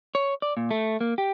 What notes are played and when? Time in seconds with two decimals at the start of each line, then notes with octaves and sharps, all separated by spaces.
0.15 C#5
0.42 D5
0.57 A#2
0.71 A3
1.01 A#3
1.18 G4